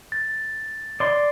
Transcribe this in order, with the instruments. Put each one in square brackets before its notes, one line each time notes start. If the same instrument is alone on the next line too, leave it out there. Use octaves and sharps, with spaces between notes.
[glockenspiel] A6
[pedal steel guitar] D5 C6